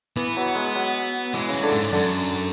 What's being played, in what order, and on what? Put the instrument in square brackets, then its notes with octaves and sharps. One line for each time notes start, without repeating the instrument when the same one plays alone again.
[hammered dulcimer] E3 [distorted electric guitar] B3
[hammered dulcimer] F#3
G#3
F#3
[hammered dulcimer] E3 [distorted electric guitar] G#3
[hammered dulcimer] C#3 [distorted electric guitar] F#3
[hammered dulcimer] D3
[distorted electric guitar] G#2
[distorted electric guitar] F#2 [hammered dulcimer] D3